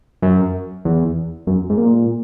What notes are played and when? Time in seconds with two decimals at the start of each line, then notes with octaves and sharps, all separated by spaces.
0.22 F#2
0.85 E2
1.47 F#2
1.70 G#2
1.78 A#2